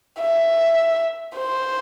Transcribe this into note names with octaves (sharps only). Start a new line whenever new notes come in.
E5
C5